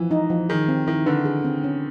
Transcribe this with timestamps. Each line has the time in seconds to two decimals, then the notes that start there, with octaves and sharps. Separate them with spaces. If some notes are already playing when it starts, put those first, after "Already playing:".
Already playing: E3 F3
0.11 D#4
0.30 F3
0.49 D#3 G#4
0.68 C4
0.87 D#3 E4
1.06 D3 B4
1.25 G#4
1.45 C4
1.64 C#4